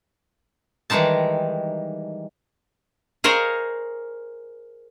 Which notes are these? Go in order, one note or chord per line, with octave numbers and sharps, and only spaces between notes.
D#3 E3 G3 G#3 D#4 A5
G#4 A#4 C5 C#5 D#5 F5